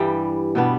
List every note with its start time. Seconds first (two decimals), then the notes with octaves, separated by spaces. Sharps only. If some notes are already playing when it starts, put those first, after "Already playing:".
Already playing: G2 E3 G3 E5 G5
0.55 B2 G3 B3 D4